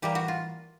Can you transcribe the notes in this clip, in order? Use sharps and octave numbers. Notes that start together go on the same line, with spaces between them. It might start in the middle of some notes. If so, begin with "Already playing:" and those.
E3 G3 A#3 G4
F#4
F4